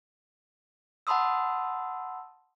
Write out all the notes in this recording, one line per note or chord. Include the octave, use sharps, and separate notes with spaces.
F#5 A5 B5 C6 D#6 E6